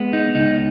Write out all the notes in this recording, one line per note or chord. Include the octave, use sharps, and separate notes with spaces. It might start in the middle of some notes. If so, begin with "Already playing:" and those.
Already playing: G#3 B3
D#4
C#2 D#4